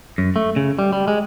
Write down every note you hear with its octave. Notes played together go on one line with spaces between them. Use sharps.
F#2
A3
C#3
G3
G3
G#3